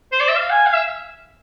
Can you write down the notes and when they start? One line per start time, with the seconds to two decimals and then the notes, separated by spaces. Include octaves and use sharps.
0.12 C5
0.20 D5
0.28 E5
0.36 F5
0.50 G#5
0.66 F5
0.74 E5